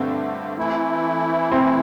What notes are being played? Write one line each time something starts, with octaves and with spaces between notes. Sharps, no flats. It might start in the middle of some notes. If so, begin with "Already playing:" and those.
Already playing: G2 D3 A3 C4
E3 A3 E4
C4